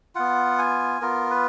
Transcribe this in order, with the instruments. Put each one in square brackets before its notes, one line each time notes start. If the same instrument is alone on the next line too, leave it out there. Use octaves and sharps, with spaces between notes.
[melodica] B3 F4 F#5
G#5
B3 F4 A#4
B4